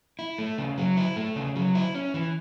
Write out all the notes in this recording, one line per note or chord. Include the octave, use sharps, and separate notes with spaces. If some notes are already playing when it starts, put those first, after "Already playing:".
E4
A3
C#3
F#3
E4
A3
C#3
F#3
E4
C#4
E3